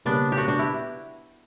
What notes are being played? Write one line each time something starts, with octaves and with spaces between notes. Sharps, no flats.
C#3 G3 A#3 B3 C#4 D4
G4
D4 F#4
D4 F#4
E4 G4